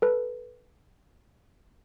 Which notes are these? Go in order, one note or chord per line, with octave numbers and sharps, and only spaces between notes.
A4 B4